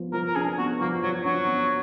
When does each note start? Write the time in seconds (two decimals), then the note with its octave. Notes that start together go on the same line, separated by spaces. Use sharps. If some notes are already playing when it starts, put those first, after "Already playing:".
Already playing: F3 B3
0.13 F3 A#4
0.26 A#4
0.36 D4 G#4
0.58 B3 F#4
0.81 F3 A#3
1.03 F3 F#3
1.25 F#3 D4
1.47 B3